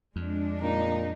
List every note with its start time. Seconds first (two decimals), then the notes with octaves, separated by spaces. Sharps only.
0.16 F2 G#3 D4
0.62 A#2 D#4